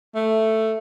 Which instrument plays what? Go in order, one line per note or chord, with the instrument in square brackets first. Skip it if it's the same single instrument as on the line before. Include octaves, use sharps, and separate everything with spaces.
[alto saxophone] A3